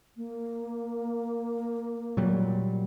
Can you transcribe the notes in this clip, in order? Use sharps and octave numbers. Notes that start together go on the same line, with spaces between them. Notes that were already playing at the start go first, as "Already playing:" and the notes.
A#3
A#2 F#3 G3